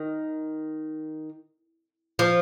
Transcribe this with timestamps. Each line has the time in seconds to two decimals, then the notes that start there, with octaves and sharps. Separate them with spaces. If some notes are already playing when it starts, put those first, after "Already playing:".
Already playing: D#3
2.19 F3